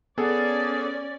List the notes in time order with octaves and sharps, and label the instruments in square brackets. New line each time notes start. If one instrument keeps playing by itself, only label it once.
[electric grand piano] B3 G#4 A4 [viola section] C#4 D5